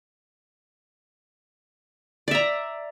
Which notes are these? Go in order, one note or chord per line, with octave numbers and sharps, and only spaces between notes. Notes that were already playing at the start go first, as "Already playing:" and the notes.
D5 E5 A#5